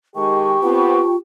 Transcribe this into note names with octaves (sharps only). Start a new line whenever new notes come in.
D#3 G#3 G4 G5 A5 C#6
B3 C4 F4